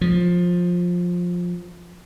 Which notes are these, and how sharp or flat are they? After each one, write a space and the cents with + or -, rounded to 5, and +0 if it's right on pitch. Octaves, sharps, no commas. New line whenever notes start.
F3 +15